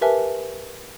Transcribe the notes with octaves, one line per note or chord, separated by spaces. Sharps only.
G4 A#4 B4 E5 G#5 A5